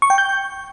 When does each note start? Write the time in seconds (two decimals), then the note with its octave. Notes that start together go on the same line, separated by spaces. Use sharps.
0.02 C#6
0.10 G5
0.18 G6